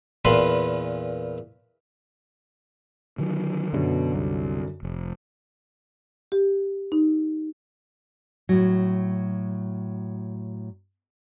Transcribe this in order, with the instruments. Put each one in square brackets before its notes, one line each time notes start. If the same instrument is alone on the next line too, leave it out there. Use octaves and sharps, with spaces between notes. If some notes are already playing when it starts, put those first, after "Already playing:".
[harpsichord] E2 A#2 B4 B5 C6
[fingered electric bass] D3 D#3 F#3
[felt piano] F#2 D3 F#4 [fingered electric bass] B2
[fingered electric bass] C2
F1
[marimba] G4
D#4
[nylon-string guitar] A2 F#3